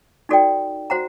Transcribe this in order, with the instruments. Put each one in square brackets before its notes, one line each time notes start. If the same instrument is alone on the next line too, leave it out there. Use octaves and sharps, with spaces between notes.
[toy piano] D#4 F#4 A4 D5 G5
F#4 C5 F#5 A#5